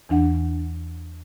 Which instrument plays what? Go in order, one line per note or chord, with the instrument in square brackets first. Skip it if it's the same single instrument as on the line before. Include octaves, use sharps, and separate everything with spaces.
[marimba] E2 E3 D4 F#5